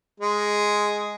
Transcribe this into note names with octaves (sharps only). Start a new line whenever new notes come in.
G#3